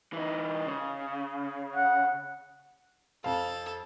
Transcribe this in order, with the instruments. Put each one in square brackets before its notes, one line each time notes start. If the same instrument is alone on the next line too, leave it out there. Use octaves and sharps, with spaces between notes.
[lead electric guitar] E3 D#4
C#3
[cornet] F#5
[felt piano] F2 F5 [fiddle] A4